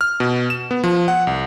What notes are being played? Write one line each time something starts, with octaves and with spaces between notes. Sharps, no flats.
F6
B2
E7
B3
F3
F#5
C2